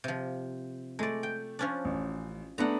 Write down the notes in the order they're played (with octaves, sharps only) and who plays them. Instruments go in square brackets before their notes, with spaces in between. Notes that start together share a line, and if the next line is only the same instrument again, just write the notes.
[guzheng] C3 F3
[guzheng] G#3 D5 [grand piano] A3
[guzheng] G5
F3 C#4 D4
[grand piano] A1
[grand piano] A3 B3 D4 [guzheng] F#5 A#5